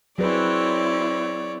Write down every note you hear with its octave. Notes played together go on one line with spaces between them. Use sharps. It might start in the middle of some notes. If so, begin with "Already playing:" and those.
F#3 C4 E4 G#4 B4 C#5 D5